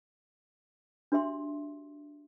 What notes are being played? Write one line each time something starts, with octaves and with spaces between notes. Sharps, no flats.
D4 F#4 G4 E5 C6